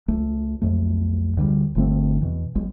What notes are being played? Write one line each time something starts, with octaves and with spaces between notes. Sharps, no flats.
C#2 A3
B1 F2 A3
D2 D3 E3 G3
G1 D3 A3 C4
E2 B2 E3
B1 G#3